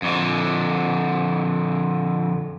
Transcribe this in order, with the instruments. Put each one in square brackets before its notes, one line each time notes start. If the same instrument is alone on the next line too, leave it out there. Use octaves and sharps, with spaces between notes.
[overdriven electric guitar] F2 D3